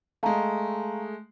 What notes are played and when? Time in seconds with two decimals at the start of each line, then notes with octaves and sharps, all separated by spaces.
0.23 G#3 A3 F5 A5 A#5